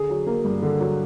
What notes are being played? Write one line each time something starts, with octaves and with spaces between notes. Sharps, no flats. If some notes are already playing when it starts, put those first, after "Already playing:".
Already playing: D3 G#4
F#3
A#3
G2
D3
F#3